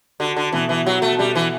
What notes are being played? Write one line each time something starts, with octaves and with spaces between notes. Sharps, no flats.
D3 F#4
D3
B2 E3
E3
F#3 F#4
A3
B2 G3
E3